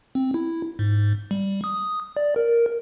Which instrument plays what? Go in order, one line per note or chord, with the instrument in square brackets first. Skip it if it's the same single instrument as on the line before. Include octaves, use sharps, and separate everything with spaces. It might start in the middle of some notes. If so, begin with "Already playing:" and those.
[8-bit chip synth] C4
E4
G#2
G3
D#6
D5
A#4